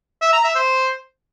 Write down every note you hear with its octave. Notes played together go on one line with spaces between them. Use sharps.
E5
A#5
E5
C5